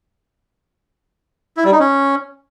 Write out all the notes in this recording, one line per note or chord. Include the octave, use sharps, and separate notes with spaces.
E4
G3
D#4
C#4